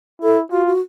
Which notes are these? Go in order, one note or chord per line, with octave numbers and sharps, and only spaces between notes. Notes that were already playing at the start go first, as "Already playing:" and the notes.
E4 A4
F4 F#4
F#4